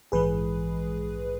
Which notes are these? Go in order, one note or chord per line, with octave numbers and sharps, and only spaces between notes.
A#1 G#2 E3 G#3 G#4 B4